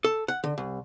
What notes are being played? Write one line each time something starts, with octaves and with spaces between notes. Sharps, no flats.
A4
F#5
D3
C2